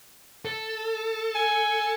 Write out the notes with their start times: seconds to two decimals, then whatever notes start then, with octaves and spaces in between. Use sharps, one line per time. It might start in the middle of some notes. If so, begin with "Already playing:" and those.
0.45 A4
1.35 G#5